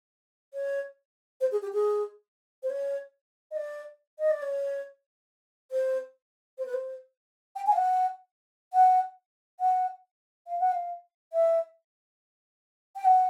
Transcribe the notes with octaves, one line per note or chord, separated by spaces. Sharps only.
C#5
C5
G#4
G4
G#4
C5
C#5
D#5
D5
D#5
D5
C#5
C5
C5
B4
C5
G5
G#5
F5
F#5
F#5
F#5
F5
F#5
F5
E5
G5
F#5